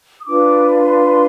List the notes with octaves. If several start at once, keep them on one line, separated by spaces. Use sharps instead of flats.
D#6
D4 F4 B4 D6
C6